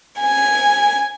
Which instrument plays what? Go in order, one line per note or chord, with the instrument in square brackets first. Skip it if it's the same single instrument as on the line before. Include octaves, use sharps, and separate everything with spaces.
[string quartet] G#5